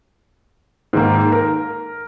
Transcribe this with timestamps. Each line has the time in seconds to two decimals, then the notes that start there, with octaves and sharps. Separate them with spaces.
0.93 G#2 D#3 A#3
1.32 A#4